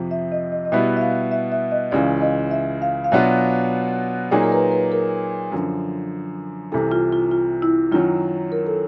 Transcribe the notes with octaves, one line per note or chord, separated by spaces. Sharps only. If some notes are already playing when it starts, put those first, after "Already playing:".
Already playing: F2 C3 F3
E5
D#5
D#5
D#5
B2 G3 B3 E4 E5
E5
F5
E5
E5
D#5
C#2 C#3 E3 D5
D#5
E5
F5
F5
B2 F#3 B3 D4 F4 E5
A#2 F#3 A#3 D#4 G#4 D5
A#4
B4
B4
A#4
F#2 D3 F3
C2 C3 E3 A4
F4
F4
F4
E4
F#2 D#3 F#3 F4
A#4
A4